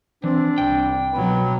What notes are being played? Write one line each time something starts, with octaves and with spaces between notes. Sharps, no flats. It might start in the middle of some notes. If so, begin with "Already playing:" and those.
E3 C4 D4
C2 G5
B2 F#3 B4